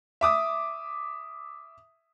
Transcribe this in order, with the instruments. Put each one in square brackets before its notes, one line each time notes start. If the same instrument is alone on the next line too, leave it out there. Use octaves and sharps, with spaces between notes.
[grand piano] E5 D6 D#6